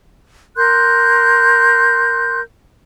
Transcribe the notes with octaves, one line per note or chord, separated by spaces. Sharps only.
A#4 C6 F#6 G6